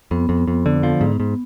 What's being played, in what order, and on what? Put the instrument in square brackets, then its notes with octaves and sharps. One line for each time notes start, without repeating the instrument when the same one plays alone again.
[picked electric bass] F2 [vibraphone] B3
[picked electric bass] F2
F2
D3
F3
G#2
G#2